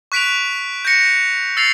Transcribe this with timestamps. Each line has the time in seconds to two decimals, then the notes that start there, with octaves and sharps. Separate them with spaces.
0.12 C#6 F#6 B6 D7 F7
0.85 G6 A#6 C#7
1.57 E6 A6 C7 F7